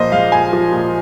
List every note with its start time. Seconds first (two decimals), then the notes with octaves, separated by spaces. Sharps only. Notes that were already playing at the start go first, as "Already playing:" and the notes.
Already playing: A#2 F3 C5 D#5
0.12 G#3 F5
0.32 A#2 G#5
0.53 F3
0.73 A#2